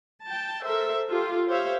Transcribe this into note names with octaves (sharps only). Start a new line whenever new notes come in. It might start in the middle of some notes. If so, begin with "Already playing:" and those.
G5 A5
A4 A#4 C5 E5
F4 G4 A4
G4 C5 C#5 E5 F5